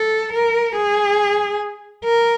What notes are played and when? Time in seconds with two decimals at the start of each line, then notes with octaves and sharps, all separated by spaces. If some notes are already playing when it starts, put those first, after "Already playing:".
Already playing: A4
0.34 A#4
0.76 G#4
2.05 A#4